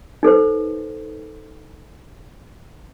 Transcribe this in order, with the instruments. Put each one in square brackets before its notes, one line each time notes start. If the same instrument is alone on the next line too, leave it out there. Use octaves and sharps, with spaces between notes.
[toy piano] D#4 A4 B4 C5